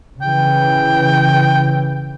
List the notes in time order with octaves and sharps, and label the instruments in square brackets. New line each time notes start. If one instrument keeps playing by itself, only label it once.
[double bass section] C#3 E3 [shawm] G5